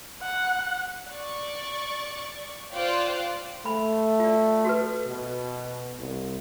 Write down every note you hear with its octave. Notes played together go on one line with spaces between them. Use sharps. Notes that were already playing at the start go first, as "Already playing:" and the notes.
F#5
D5 C#6
F4 C5 D5 F5 G5 F#6
A3 B5
F4 D5
F#4 A4 B4
B2
C2